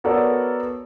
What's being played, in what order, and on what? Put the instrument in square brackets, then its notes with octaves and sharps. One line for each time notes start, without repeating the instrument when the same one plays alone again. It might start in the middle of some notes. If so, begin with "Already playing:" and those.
[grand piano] B3 F#4 A4 A#4 C#5 D5